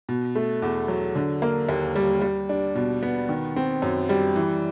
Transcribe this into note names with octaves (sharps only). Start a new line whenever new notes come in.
B2
A3
E2
F#3
D3
A#3
D#2
G3
G3
D4
B2
B3
D#3
C4
F#2
G3
E3